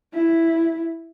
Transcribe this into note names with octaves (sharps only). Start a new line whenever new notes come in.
E4